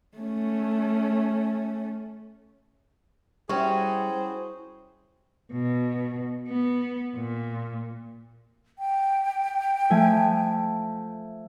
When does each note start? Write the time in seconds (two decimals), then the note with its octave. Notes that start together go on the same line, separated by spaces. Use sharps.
0.17 A3 C#4
3.49 G3 C#4 E4 F#4 G#4 C5 G5 C#6
5.52 B2
6.48 B3
7.17 A#2
8.79 G5
9.90 F3 A3 G#5